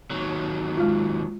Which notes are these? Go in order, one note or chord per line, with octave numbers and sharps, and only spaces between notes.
D#2 F#3
G#3 F4